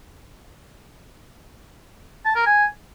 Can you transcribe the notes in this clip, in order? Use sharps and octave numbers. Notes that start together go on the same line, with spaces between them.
A5
A#4
G#5